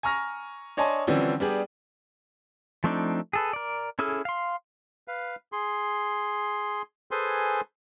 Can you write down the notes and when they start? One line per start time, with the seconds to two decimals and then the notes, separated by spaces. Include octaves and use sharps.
0.03 G#5 A#5 C#6 F6 A#6
0.77 D4 C#5 D#5 G#5 A5 C6
1.07 D3 E3 F3 G3 C4 C#4
1.40 G3 B3 D4 G4 G#4
2.84 F3 A3 C4 D4 D#4
3.33 G#4 A4 B4
3.53 A#4 D5
3.99 C#4 E4 G#4 A4 F6
4.25 F5 C6
5.08 B4 F5
5.52 G#4 C6
7.11 G#4 A4 B4 C5 G#5 C6